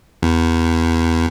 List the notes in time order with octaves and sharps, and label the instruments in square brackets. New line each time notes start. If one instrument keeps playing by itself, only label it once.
[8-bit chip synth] E2